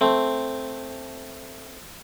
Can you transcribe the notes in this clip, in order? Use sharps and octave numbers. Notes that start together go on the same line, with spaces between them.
A3 C4